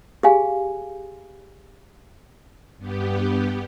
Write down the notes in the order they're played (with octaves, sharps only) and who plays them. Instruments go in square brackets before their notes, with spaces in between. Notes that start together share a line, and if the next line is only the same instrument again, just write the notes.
[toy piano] G4 G#4 F5 G#5
[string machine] G2 B3 G4